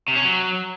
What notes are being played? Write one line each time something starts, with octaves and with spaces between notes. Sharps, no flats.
C3
C#4
F#3